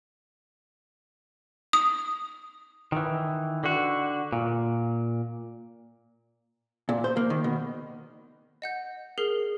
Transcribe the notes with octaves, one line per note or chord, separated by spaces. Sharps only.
D#6
D#3 E3
D3 F#4
A#2
A#2
C5
A#3
D#3
B2
D#5 F#5 G6
G#4 A#4 F6 C7 G7